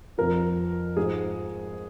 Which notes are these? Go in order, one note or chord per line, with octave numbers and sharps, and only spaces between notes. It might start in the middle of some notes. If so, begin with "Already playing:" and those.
F2 F3 A#4
G#2 F3 G#4